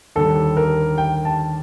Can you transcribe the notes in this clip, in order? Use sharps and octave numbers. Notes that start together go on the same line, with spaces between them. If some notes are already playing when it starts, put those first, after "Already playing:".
D#2 D3 G3 A4
A#4
G5
A5